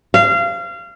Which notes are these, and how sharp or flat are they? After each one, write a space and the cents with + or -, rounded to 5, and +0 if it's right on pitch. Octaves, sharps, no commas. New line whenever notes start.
F5 -25